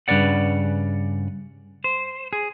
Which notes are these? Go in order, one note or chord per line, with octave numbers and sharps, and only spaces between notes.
G2 C#3 B4 D5 F#5
C5
G#4